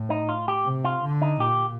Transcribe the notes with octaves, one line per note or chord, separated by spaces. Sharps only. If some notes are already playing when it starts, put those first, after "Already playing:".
Already playing: A2
D#4
F4
G4
C3
F4
D3
D#4
A#2 G4